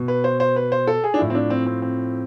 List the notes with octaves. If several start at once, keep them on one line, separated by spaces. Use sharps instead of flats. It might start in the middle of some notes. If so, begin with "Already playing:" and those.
Already playing: B2
B4
C5
C5
B4
C5
A4
G#4
D4
A2 F3 E4
C4
D4
C4
C4
C4